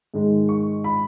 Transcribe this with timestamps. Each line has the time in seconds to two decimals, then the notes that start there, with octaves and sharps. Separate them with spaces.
0.14 G#2 D#3 G#3 D#4
0.49 C#6
0.84 B5